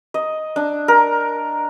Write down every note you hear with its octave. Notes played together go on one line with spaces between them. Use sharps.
D#5
D4
A#4